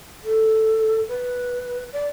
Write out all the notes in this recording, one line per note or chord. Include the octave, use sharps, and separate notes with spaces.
A4
B4
D5